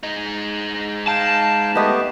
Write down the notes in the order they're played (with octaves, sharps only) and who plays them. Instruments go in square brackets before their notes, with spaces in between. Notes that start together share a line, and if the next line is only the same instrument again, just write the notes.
[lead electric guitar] G#3 D#4
[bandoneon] F5 G5 [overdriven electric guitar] A5
[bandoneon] A3 B3 G4 [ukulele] B4 D#5